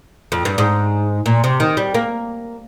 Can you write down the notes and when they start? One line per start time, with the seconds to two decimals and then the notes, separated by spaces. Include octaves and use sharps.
0.32 F2
0.45 G2
0.58 G#2
1.26 A#2
1.44 C3
1.60 D#3
1.77 G3
1.94 A#3